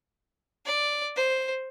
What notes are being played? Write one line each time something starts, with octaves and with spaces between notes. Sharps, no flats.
D5
C5